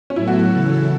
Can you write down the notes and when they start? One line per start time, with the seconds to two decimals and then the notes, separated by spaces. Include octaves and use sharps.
0.10 C#4
0.16 A2 F#3 B3 E4 A4
0.27 F#4
0.51 C#3 E3 C#4 E4 A4